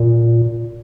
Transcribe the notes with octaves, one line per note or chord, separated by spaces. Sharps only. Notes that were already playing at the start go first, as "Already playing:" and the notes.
Already playing: A#2